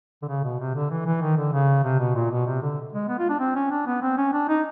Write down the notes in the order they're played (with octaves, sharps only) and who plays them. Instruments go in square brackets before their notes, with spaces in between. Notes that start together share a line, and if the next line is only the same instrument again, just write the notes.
[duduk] D3
C#3
B2
C3
D3
E3
E3
D#3
D3
C#3
C3
B2
A#2
B2
C3
D3
G#3
B3
F4
D4
C4
C#4
D4
B3
C4
C#4
D4
D#4